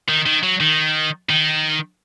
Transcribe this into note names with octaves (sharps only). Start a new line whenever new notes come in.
D#3
D#3
F#3
D#3
D#3